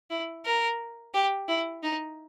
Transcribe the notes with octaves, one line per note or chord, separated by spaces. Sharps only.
E4
A#4
G4
E4
D#4